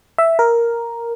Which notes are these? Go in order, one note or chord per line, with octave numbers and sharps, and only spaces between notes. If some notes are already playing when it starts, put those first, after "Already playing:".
E5
A#4